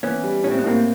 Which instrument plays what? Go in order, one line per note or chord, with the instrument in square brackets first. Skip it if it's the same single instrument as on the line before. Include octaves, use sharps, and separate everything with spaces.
[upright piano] E3 [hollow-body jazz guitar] B3 C#4
[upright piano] G3
[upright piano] A2 [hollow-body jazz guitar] C#4
[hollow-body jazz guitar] C4
B3
[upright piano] A2 [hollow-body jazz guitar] A#3 C4